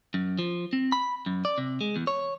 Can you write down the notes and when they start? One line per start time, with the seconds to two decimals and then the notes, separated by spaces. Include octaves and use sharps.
0.14 F#2
0.39 F3
0.73 C4
0.92 B5
1.26 F#2
1.45 D5
1.58 C3
1.81 G#3
1.96 E2
2.07 C#5